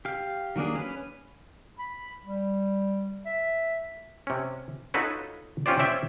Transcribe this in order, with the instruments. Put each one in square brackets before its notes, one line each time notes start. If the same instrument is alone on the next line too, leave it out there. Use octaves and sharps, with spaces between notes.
[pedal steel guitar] G4 F5
D#3 F#3 A#3 D4 G#4
C#4 B4
[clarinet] B5
G3
E5
[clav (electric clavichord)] C3 C#4
D#4 F4 F#4 A4 B4 C#5
C4 C#4 F4 G4 C5 D5
C4 C#4 D5 E5 G5 G#5